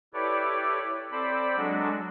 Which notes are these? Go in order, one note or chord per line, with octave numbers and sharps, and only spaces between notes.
E4 G4 A4 B4 C#5 D5
C4 A4 C5 D5 B5
F#3 G#3 D4 F#4 A4